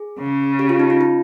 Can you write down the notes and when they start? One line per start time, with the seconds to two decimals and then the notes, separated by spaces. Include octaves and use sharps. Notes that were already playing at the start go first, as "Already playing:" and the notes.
Already playing: G#4
0.19 C#3
0.59 G4
0.69 F4
0.79 D#4
0.90 F4
1.01 D#4